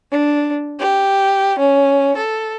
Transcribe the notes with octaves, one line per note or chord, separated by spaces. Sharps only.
D4
G4
C#4
A4